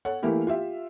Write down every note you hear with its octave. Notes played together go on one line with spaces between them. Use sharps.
A4 C#5 F#5
E3 A3 A#3 E4 G4
F4 G4 E5